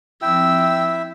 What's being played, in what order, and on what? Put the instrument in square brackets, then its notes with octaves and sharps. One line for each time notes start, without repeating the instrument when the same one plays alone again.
[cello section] F3 C4 [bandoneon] E4 E5 [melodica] G5 [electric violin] E6